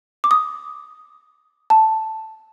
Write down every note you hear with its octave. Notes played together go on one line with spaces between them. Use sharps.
D6
D#6
A5